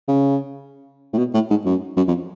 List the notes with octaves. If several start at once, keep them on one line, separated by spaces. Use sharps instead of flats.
C#3
A2
B2
A2
G#2
F#2
F#2
F2